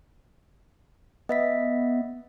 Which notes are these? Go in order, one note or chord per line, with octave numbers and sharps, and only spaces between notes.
B3 D#5 E5 B6